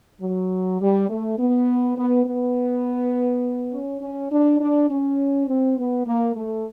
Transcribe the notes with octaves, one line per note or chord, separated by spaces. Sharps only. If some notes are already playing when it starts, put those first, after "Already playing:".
F#3
G3
A3
B3
B3
B3
C#4
C#4
D4
D4
C#4
C4
B3
A#3
A3